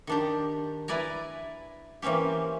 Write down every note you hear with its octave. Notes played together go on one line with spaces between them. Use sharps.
D#3 D4 G4
E4 B4 D5 G#5 A#5
E3 A#3 C4 C#4 G4